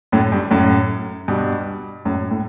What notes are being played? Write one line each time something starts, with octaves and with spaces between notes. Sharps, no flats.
F#2 A2
G2
F#2 A2
G2 B2
F#2 A2
A2